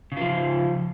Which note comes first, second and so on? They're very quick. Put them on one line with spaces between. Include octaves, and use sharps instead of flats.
C#3 F4 F3